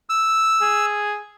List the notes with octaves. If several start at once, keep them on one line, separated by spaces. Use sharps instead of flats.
E6
G#4